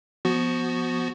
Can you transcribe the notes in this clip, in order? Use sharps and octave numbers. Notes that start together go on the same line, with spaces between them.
F3 B3 F#4